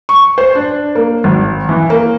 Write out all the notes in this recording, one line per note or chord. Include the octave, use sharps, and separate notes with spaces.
C#6
C5
D4
A#3
G#1
E3
A#3